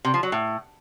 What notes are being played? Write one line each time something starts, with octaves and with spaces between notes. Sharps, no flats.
C3
F3
F#3
A2